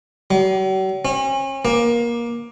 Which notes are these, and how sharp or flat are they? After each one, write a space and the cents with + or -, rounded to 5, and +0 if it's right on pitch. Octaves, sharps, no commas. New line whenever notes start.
F#3 +45
C#4 -35
A#3 +20